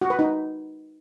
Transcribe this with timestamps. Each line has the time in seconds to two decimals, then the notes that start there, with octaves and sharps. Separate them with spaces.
0.01 F#4
0.10 B4
0.19 D#4